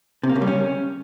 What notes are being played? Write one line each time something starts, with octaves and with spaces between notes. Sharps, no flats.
C3
A#3
C#3
G3
C#4